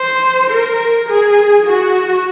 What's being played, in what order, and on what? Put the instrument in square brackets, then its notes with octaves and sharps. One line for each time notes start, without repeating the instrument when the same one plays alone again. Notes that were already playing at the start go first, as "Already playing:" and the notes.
Already playing: [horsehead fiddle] C5
A#4
G#4
F#4